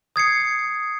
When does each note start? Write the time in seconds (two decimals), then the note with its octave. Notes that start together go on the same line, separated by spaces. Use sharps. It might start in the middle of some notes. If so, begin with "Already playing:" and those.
0.16 D#6 G#6 C7 C#7